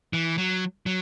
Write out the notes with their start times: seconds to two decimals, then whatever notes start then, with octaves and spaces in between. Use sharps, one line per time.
0.13 E3
0.38 F#3
0.86 F#3